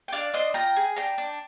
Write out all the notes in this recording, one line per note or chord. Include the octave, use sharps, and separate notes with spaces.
G5
D4 D5 F5
D4 C5 D#5
F4 G5 A#5
G#4
D4 G5 A#5
D4